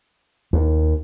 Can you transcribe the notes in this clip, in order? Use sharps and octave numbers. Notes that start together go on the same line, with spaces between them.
D#2